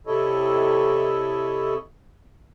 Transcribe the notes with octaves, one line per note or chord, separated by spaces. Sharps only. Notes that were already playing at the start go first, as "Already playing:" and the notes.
C3 E4 A4 C#5 D#5